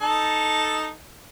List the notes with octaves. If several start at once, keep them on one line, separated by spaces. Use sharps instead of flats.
D#4 A4 A5